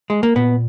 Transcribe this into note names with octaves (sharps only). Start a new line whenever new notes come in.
G#3
A#3
A#2 B3